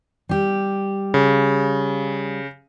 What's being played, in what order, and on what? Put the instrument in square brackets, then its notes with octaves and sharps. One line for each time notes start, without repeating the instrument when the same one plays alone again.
[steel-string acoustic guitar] G3 G4
[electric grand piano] C#3